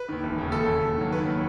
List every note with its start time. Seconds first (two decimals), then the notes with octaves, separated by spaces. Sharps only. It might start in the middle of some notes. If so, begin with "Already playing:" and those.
Already playing: B4
0.09 D#2 D#3
0.23 E1
0.38 D#2 C#3
0.52 E1 A4
0.68 D#2 C#3
0.82 D#2
0.97 D#3 F#3
1.12 D#2 B4
1.26 D#3 F#3